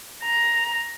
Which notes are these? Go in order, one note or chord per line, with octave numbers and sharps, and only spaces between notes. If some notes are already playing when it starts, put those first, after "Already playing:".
A#5